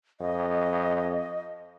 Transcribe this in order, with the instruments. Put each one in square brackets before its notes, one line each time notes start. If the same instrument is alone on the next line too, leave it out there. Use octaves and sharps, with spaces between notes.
[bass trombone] F2 [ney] D#5